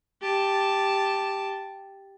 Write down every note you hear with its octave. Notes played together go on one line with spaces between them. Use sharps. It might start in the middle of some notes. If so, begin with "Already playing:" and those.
G4 A5